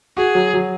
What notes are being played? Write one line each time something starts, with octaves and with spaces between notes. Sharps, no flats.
F#4 G#4
F#3
F#3